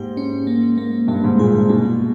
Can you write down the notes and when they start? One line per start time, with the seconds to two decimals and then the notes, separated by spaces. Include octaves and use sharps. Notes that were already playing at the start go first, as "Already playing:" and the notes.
Already playing: G#2 A#3 G4
0.17 C#4
0.47 A#3
0.78 A#3
1.08 G2 A#3
1.24 G#2
1.39 A#2 G#4
1.54 G#2
1.69 B2 A#3